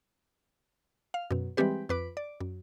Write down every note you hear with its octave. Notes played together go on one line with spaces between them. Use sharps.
F5
F#2 B2
E3 G3 G#3 C4 G4 B4
F2 B4 D6
D5
F#2